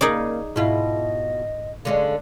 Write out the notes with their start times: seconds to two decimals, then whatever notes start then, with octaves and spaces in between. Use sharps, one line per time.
0.01 C#3 A#3 D#4 G#4 D5
0.56 G#2 B2 E4 F4 D#5
1.85 D3 G#3 C#4 F5